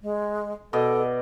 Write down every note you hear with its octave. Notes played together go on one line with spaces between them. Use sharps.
G#3
B2 A4 D5 D#5